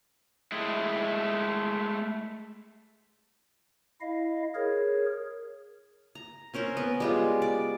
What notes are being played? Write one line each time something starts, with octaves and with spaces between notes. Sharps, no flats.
G#3 A3 E4
E4 D#5 F5
G#4 A#4 C#5
A#5
C4 C#4 A#4 C5
B3
G3 G#3 F4
D5